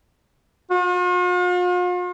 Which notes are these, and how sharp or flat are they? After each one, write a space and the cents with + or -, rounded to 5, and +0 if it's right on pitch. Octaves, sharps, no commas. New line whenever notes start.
F4 +45